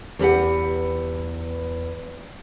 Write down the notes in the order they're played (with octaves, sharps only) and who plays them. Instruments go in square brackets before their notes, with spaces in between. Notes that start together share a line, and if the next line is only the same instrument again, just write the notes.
[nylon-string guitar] E2 G4 B4 F#5